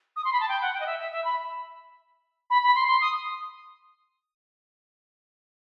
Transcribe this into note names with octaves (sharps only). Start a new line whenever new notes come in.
D#6
C6
B5
A5
G5
F#5
G5
D#5
E5
E5
E5
B5
B5
B5
C6
C6
D#6